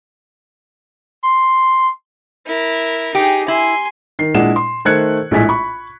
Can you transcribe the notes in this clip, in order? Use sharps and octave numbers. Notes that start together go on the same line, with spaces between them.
C6
E4 A#4
D#4 G4 G#4
E4 G#5 C6
D#3 C7
A#2 G#3 D4 E4 F#5 E7
C6
D#3 A3 C5 F#6 G#6 C#7
A#1 A2 G#3 E4 G#5 B6
B5 C#6